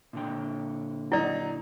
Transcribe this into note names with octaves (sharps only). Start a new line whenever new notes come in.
A#2 D3 G5
F#3 D#4 E4 D5